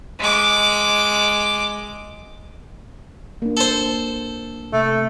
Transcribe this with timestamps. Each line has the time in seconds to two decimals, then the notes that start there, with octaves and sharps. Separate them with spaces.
0.20 G#3 D6
3.42 A#3 D4
3.57 A4 C5
4.73 C3 A3